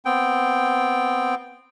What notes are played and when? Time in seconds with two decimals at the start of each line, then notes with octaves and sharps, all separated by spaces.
0.05 B3 C4 G5